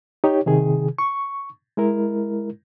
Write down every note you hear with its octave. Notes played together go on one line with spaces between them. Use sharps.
D#4 G4 C#5
C3 D#3 G#4
C#6
G#3 E4 A#4